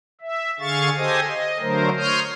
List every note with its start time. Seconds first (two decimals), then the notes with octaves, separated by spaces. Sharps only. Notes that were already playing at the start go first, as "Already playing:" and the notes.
0.21 E5
0.60 D3 G#4 F5 C#6 A6
0.97 G4 A4 C5 D#5 G#5 D#6
1.28 D#5
1.60 D3 F#3 A3 A#4 C5
1.97 C#5 C6 D#6 F6 G6